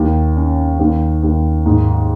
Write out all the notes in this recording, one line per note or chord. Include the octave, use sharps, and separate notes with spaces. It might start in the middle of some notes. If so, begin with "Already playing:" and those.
Already playing: D#2
C#4
D#2
D#2
G#2